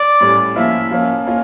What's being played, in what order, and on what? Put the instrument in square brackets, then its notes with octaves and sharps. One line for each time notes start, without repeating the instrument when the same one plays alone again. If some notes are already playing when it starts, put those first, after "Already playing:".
Already playing: [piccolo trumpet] D5
[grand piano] A2 G3 C#4
[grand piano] F3 A#3 C#4 E4 A#4 [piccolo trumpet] E5
[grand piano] F3 A#3 C#4
A#3 C#4 F4